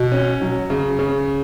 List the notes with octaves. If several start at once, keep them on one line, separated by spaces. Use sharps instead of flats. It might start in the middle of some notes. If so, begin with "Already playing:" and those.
Already playing: B2
C#4
F#3
C#3
C#3